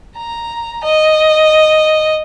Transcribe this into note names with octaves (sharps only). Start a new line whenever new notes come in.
A#5
D#5